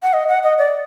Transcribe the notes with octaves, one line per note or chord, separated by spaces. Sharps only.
F#5
D#5
F#5
D#5
D5